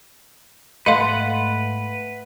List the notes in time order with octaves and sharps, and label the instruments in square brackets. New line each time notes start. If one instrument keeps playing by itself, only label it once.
[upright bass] G#2 [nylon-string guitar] A3 B3 [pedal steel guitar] B4 F#5 [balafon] D#5 F5 C6